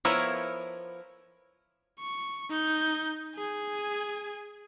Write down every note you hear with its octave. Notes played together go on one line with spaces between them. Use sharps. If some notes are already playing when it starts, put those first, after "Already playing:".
F3 B3 E4 A#4 C#5
C#6
D#4 G6
G#4 G#5